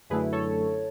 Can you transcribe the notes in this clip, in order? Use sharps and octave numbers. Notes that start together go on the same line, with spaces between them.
F#2 D3 A3 E4 G#4 B4
A4 C#5